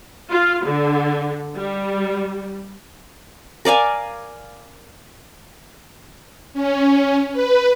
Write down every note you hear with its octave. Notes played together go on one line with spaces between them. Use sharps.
F4
D3
G3
A#4 D5 F5 G#5
C#4
B4